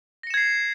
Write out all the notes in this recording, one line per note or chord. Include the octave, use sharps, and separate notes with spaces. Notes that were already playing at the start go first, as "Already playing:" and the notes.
G#6 A#6 C7 C#7 E7